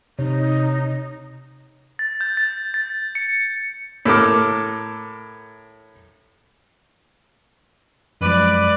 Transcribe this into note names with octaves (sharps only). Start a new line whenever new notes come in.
C3 D#4 C#5
A6
G6
A6
A6
C#7
A2 A4 A#4 D6
F#2 F3 G#3 B4 D5